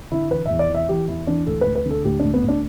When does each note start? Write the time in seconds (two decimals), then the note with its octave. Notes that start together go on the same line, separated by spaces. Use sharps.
0.12 D3 E4
0.31 E3 B4
0.46 E2 E5
0.59 D5
0.69 E3
0.75 E5
0.89 E3 G4
1.08 E2 E4
1.27 E3 D4
1.46 D2 A4
1.61 D2 B4
1.76 B4
1.86 D3 A4
2.05 D2 G4
2.20 D2 D4
2.34 B3
2.44 D2 D4